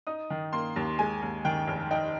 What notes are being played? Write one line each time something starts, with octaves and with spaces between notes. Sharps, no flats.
D#4 D#6
D#3
A#3 C6
D#2
G#3 G#5
D#2
D#3 G5
F1
D#4 G5